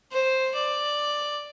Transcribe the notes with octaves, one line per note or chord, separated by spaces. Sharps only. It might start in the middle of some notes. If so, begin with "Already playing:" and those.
C5
D5